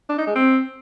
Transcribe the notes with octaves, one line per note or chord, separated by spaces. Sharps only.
D4
D#4
G#3
C4